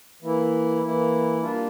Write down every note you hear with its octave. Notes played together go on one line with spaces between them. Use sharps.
E3 A#3 E4
E3 A#3 E4
G3 A#3 D4 F4